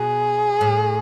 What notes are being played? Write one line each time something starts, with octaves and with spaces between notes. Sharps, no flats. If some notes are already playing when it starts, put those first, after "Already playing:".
Already playing: B2 G#4
A2